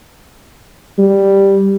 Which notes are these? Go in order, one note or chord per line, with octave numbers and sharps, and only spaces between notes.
G3